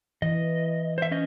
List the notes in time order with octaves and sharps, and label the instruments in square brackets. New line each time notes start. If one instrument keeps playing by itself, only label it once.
[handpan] E3 [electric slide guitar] D#5
[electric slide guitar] C5 E5
C#4 D#5